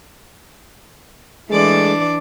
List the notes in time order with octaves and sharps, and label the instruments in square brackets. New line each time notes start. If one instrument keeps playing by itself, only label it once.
[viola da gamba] E3 D4 D5 [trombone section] G#3 A3